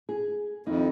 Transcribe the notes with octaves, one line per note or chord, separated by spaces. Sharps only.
G#4
F2 D#3 D#4 E4